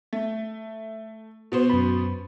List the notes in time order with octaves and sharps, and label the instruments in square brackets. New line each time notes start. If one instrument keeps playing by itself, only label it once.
[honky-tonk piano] A3
B2 B3 C5
[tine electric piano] F#2 B5